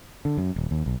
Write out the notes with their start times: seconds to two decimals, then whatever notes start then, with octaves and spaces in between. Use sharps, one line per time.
0.25 D3
0.37 F#2
0.56 D#1
0.71 D#2
0.86 B1